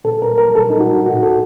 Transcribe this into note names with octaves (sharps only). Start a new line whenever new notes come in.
A#2 A4
A#4
A#4
A#2 A4
D#4
F#4
A2 F#4
A4